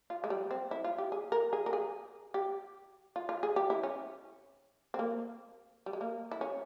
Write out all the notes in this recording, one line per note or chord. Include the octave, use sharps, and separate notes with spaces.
F4
G#3
G3
C4
E4
F4
G4
G#4
A#4
G#4
A#4
G#4
G4
F4
F4
G#4
G4
E4
C#4
C4
A#3
G3
G#3
A#3
E4
C#4